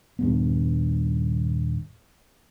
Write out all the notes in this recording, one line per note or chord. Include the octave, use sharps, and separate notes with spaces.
D#1 G2 B3